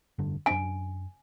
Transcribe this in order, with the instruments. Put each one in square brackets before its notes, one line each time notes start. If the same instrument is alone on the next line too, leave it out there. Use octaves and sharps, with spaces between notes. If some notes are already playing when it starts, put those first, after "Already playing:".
[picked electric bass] F1 G2 D3
[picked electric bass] F#2 D4 [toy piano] G#5